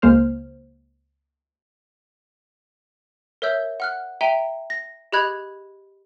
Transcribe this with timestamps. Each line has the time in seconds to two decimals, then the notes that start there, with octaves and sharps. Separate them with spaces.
0.02 C#2 G#3 A#3 C5 F6
3.42 A#4 C#5 E5 E6 G6
3.80 F#5 F6 F#6
4.21 E5 G5 A#5 D#7 G7
4.70 A#6
5.12 G4 G#4 D#5 B5 F#6 G#6